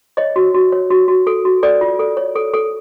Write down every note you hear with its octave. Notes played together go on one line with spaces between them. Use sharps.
C#5 D#5
F#4
F#4
C#5
F#4
F#4
A4
F#4
A4 D5
F4
A4
C#5
A4
A4